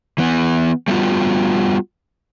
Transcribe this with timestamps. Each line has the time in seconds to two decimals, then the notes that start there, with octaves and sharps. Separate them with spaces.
0.18 E3 B3
0.88 G3 A3 B3 D#4 F4 F#4